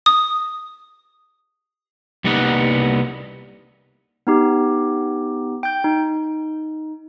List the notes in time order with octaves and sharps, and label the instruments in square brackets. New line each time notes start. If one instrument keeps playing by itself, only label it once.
[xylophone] D#6
[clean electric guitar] C2 G3 A#3 B3 D#4 F#5
[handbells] B3 D#4 G4
G5 G6
D#4